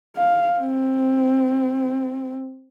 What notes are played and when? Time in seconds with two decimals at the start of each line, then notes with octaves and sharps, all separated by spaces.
0.16 F5
0.59 C4